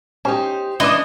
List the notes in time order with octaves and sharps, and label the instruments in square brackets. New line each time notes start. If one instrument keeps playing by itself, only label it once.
[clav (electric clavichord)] C#4 [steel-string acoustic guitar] D#4 G4 C5
[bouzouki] E3 [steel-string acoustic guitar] C#4 D4 [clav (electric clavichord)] E4 B4 D5 [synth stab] D#5